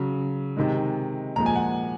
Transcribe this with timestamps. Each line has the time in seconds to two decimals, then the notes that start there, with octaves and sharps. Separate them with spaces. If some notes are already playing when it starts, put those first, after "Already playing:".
Already playing: C#3 F#3
0.57 C3 D#3 G#3
1.36 A#2 F3 G#3 A#5
1.46 G#5
1.56 F#5